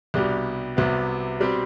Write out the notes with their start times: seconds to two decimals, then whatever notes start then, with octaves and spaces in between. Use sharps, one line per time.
0.14 C2 B2 G3 D4 G4
0.77 C2 C3 F#3 B3
1.40 B2 G3 C4